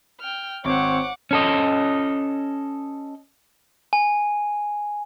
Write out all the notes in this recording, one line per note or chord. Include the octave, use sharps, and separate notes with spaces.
G5 F6
G#1 C4 C5 C#5 F#5 D6
C#4 A4 D#5
G#5